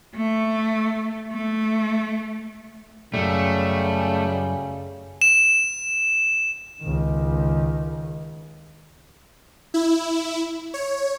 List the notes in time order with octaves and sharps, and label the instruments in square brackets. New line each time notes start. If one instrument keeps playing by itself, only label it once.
[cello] A3
A3
[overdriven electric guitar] C#2 F#2 [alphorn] C#3 [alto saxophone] G3 [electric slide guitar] A3
[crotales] E7
[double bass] C#2 D#3
[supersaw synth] E4
C#5